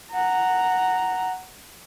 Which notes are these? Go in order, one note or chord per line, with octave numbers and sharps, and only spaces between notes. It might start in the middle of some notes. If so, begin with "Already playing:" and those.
F#5 A#5